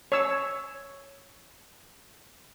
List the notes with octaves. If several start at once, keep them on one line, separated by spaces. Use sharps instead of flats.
C#5 E6